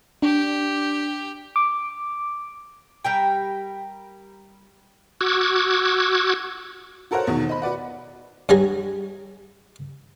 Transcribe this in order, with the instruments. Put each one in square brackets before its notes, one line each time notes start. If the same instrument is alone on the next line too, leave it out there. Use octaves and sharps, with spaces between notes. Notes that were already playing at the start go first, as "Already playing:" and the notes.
[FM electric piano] D4 [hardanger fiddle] G4
[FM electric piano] D6
[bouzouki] G3 A#4 G5
[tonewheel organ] F#4 D6 E6 F#6 G#6
[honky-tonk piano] F#4 A4 A#4 C5 C#5 F#5
E2 B2 D#3
C5 D#5 B5
F#4 B4 D5 F#5
[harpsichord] G2 F#3 G3 G#4 G#5 A#5